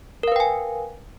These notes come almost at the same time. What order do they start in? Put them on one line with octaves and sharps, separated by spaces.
A#4 F5 B4 G5 G#5